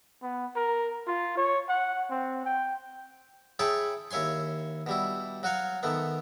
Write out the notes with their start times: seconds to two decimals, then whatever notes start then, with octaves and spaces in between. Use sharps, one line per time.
0.23 B3
0.56 A#4
1.07 F4
1.37 C#5
1.69 F#5
2.10 C4
2.46 G5
3.59 E4 G#4 C#5 G5 A5 B5
4.11 D#2 E4 C#5 G#5 C6
4.86 B2 G3 E4
5.43 F#3 F#4 C#5 F5
5.83 D#3 A3 B3